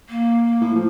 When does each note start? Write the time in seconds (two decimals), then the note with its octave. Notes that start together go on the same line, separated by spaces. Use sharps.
0.09 A#3
0.61 A2
0.75 F3